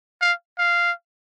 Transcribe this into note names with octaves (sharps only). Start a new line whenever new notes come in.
F5
F5